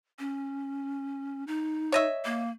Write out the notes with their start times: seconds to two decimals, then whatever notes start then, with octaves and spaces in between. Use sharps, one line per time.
0.19 C#4
1.47 D#4
1.92 C#5 D#5 E5
2.25 A#3